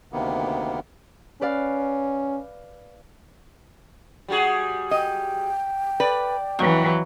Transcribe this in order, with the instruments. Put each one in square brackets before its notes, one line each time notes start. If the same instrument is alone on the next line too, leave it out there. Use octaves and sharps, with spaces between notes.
[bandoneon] D2 C3 D#3 A#3 B3
[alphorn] C#4 [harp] B4 D5 F5
[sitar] G3 F#4 G#4
[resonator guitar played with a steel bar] D#5 [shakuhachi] G5
[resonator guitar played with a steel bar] B4 [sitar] D5
[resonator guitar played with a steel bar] F2 [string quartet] E3 F#3